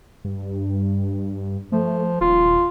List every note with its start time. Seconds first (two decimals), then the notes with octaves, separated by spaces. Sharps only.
0.25 G2
1.72 F3 A3
2.21 D#1 F4